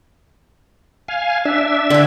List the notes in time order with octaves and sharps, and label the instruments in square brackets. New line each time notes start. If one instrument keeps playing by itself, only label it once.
[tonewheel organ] F5 G#5
D4 E5
[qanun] D3 G#5